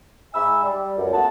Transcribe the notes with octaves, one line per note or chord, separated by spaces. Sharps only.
G#2 E5 G#5 B5 E6
G3
C#2 F#2
A3 B3 F#5 A5